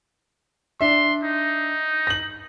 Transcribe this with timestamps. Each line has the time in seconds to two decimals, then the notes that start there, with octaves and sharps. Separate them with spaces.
0.81 D4 E5 C6
1.23 D#4
2.07 A#6 F#7